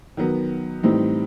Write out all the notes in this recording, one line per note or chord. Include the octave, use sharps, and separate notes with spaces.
D#3 F#3 B3
A2 E3 G3 C4 D#4